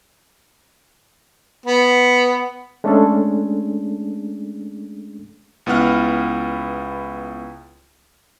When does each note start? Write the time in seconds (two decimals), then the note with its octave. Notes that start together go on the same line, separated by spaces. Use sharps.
1.66 B3
2.84 G#3 A3 C#4 D4 G#4 A4
5.66 C#2 B3 E4 F#5 F6